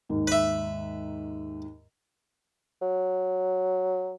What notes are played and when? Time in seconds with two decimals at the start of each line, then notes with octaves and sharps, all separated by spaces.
0.09 D#2 G#2
0.27 B4 E5
2.82 F#3